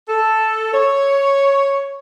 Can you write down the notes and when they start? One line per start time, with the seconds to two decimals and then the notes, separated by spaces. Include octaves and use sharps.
0.09 A4
0.74 C#5